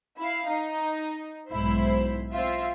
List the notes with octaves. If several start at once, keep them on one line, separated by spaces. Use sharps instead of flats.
E4 F5
D#4
B1 G#2 E4 C5
C4 F4 E5